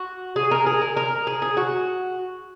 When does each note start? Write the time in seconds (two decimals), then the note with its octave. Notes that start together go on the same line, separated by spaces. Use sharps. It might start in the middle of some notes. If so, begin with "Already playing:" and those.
Already playing: F#4
0.36 G#4
0.51 A#4
0.67 G#4
0.82 A#4
0.97 A#4
1.27 G#4
1.42 G#4
1.57 F#4